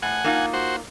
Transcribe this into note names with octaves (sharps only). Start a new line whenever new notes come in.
A2 F#5 G#5
A#3 D#4 F4
F#4 C5